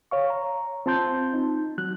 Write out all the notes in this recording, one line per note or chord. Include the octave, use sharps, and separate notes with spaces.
C#5 F5 C#6
A#5
C4 F4 A5 C6 G6
D#4
F#3 F#6